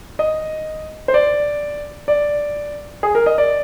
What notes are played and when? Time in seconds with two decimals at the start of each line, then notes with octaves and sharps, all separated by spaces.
0.19 D#5
1.08 C5
1.14 D5
2.08 D5
3.03 G#4
3.15 A#4
3.26 D#5
3.38 D5